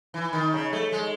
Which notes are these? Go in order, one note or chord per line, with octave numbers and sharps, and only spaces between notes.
E3
D#3
C#3
A3
G#3